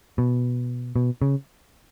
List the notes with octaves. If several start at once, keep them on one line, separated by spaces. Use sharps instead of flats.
B2
B2
C#3